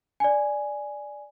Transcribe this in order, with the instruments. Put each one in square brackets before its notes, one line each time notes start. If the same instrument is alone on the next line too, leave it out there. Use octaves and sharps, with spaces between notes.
[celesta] D5 G#5